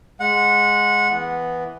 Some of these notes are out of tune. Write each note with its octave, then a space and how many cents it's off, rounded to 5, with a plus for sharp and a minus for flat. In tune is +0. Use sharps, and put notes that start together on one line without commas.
G#3 +0 F#5 -20
E3 +0 B3 +0